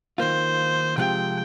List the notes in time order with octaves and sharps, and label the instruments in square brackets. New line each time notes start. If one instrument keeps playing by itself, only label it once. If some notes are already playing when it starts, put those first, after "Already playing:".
[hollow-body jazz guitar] D#3 A#3 F4 [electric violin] C5
[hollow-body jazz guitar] C3 F3 G#3 C4 F4 [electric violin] G5